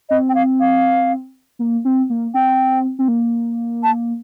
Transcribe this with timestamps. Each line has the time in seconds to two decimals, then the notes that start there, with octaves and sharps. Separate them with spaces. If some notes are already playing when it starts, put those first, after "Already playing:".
0.09 C4 D#5
0.29 G5
0.35 F5
0.60 F5
1.59 A#3
1.85 C4
2.10 A#3
2.34 C4 G5
2.99 C4
3.08 A#3
3.83 A5